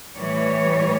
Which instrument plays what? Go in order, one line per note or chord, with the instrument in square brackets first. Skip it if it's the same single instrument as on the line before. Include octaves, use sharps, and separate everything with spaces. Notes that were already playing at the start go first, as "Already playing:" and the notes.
[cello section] A2 E3 G3 C#5